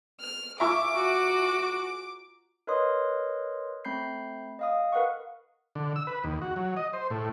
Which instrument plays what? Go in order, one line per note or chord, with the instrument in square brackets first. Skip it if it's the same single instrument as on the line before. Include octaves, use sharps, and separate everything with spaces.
[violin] F6
[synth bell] F4 G#5 A#5 [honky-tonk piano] E5 C#6 E6 [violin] D6
[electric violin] F#4
[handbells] A#4 B4 C#5 D#5 C6 D#6
A3 C4 B5 G6 C7
D#5 F5 D#6
A#4 B4 F5 F#5 C#6
[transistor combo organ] D3
E6
B4
D#2
F#4
F#3
D#5
C5
A2